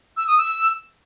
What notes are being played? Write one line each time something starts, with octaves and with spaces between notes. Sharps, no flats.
E6
D#6
E6